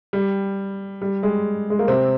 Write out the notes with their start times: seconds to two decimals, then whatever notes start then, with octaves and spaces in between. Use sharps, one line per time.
0.13 G3
1.01 G3
1.23 G#3
1.70 G#3
1.79 A#3
1.88 C3 C4